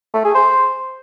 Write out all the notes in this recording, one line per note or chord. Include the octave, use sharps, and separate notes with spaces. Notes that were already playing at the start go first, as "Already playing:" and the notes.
A3
G#4
C5